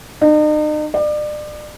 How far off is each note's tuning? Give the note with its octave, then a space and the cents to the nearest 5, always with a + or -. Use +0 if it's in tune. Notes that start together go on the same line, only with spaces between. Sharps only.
D#4 -40
D5 +35